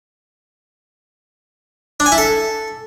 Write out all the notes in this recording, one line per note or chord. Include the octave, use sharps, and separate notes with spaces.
D4
G#5
E4
A4